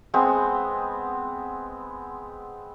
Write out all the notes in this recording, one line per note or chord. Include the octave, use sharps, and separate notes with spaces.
G#3 B3 C4